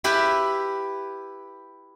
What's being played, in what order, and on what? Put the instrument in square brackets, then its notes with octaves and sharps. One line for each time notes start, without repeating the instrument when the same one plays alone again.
[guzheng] E4 G4 B4 E5